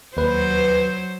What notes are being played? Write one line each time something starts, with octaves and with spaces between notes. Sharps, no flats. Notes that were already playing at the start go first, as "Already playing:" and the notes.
D#2 F#3 B4 C5